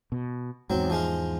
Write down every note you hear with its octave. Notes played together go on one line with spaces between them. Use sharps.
B2
E2 G#2 F#3 C4
F3 G#3 F4